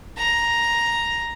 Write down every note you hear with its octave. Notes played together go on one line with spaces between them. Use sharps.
A#5